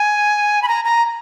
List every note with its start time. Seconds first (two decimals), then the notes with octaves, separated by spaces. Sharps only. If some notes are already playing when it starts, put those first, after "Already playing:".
Already playing: G#5
0.62 B5
0.68 A#5
0.85 A#5